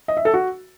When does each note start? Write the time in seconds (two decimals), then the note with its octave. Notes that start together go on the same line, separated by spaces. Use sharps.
0.08 D#5
0.17 E5
0.25 A4
0.34 F#4